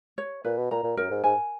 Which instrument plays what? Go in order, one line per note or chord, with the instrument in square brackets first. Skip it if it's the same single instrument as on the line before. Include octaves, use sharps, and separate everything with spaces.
[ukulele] C#5
[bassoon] A#2 [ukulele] B4
[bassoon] B2
[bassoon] A#2 [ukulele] A#5
[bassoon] A#2
[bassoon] F#2 [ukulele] A#4
[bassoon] G#2
[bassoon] G#2 [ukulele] G#5